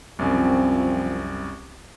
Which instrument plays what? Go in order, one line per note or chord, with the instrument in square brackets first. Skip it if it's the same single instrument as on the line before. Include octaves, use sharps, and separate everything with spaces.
[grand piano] C2 F#2 [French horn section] F3 C4